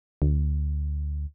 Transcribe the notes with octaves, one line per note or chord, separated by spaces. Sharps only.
D2